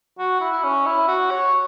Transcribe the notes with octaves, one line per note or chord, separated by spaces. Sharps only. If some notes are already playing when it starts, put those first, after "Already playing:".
F#4
E4
E4
C#4
E4
F#4
C#5